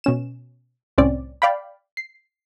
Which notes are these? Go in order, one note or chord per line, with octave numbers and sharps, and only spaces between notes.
B2 C#4 E7
C2 A2 C4 C#4 D5
D5 F5 G5 B5
C7